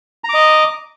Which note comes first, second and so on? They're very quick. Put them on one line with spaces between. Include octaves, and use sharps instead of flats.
A#5 D6 D#5